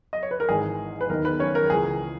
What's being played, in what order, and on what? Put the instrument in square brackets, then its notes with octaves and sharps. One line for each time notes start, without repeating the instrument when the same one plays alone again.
[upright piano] D#5
C#5
B4
A#4
G#1 G#2 E3 G#4
B4
D#2 D#3 A#4
B3 B4
C#4 C#5
A#4
C#2 C#3 E3 G#4